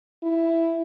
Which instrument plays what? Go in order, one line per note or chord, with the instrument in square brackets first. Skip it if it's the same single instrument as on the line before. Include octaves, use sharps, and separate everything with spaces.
[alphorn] E4